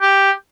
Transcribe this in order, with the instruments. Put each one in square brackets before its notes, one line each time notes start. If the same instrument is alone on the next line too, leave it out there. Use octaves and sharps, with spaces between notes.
[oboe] G4